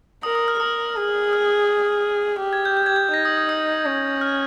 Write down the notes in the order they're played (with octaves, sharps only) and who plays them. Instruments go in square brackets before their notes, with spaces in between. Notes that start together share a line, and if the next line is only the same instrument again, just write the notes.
[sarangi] A#4 [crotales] D#6
[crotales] D#6
F6
[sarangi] A#4 [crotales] D#6
[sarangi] G#4
[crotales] F6
[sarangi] G4
[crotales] G#6
G6
G6
G#6
G6
[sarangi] D#4 [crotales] A#6
[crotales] D#6
D#6
D#6
[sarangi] C#4
[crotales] F6